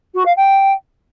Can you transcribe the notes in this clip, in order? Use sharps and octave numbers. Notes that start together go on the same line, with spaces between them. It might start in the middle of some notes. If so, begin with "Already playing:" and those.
F#4
F5
G5